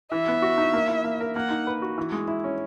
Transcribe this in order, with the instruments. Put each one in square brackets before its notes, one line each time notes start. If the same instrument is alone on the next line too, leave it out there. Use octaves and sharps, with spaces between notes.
[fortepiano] E3 [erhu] E5
[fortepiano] B3
F#4
D#4
A#3
E4
A#3
A#4
[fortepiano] A#3 [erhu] F#5
[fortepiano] D#4
B4
F#4
E3
G#3
E4
C#4